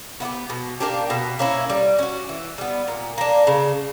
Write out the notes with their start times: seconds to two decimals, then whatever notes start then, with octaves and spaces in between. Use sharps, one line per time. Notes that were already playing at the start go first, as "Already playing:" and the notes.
0.20 B3 E4
0.25 G4
0.50 B2
0.80 A#3 D4 G4
1.10 B2
1.39 A#3 C#4 E4
1.70 G3
1.99 C#4 F#4
2.29 E3
2.58 G3 B3
2.88 A#2
3.18 A#3 D4
3.47 C#3